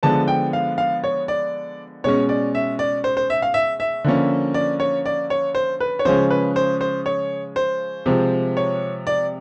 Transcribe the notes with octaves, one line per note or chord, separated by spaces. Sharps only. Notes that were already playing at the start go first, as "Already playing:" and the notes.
D3 F3 G#3 B3 A5
G5
F5
F5
C#5
D5
B2 G#3 C#4 C#5
D5
E5
D5
C5
C5
E5
F5
E5
E5
D3 F3 A#3 C#4
D5
C#5
D5
C#5
C5
B4
C#5
C#3 F3 G#3 C#4 C5
B4
C5
C5
C#5
C5
C3 F3 G#3
C#5
D5